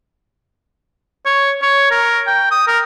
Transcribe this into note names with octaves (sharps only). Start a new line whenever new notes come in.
C#5
C#5
A#4
G5
D#6
A#4